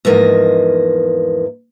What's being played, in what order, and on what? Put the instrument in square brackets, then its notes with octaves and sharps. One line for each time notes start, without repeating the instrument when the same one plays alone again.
[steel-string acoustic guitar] E2 G#2 F3 A#3 D#5